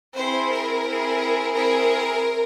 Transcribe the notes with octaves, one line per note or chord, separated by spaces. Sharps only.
C4 E4 G#4 C5
A#4
C4 E4 G#4
C4 E4 G#4 A#4